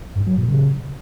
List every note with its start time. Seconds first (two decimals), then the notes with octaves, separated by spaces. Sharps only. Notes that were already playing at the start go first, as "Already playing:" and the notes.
0.16 G2
0.27 F#3
0.38 A#2
0.48 C#3